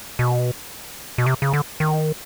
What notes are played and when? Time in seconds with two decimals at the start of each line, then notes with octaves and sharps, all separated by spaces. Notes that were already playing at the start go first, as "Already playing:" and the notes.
0.19 B2
1.18 B2
1.26 C3
1.42 C#3
1.53 D3
1.80 D#3